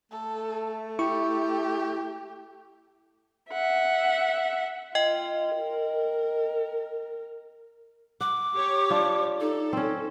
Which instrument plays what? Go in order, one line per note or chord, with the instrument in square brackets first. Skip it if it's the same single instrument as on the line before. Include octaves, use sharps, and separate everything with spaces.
[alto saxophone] A3 [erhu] A4
[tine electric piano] E4 C#6 [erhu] G4
[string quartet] E5 F#5
[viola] F4 [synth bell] D#5 G5
[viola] A#4
[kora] F#5 [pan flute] D6
[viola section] G4 C#5
[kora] D4 F4
[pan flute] D#4 [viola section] A4
[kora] C4 C#4